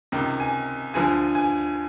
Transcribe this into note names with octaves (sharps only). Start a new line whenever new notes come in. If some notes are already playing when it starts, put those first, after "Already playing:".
C#2 C3 D#3
G#5
D2 D3 F3 G#5
G#5